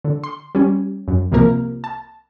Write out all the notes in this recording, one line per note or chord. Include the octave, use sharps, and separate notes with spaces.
D3
C6
G3 C#4
F#2
C2 C3 F3 A#3 A#4 A#5
A5